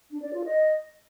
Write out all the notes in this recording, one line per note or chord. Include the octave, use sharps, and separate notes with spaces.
D4
D5
F4
D#5